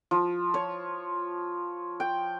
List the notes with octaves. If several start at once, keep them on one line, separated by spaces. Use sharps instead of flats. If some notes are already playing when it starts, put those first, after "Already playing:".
F3
C#5
G5